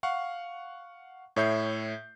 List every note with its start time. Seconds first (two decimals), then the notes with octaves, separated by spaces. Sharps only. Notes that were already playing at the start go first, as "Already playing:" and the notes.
0.03 F5 F#5 C#6
1.36 A2 C#5 E5 G6 C7